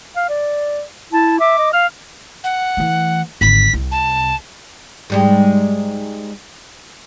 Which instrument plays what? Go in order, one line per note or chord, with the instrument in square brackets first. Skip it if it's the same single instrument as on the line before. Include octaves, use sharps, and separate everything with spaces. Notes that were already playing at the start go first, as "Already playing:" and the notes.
[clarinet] F5
D5
[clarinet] E4 [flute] A5
[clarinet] E5 [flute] D6
[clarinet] D#5
[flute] F5 [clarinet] F6
[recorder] F#5
[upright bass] E3 A3
[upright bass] G#1 D3 [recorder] B6
[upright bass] C2 C3
[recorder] A5
[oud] G#2 G3 G#3